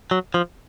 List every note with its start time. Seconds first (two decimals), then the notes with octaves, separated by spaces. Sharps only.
0.11 F#3
0.34 F3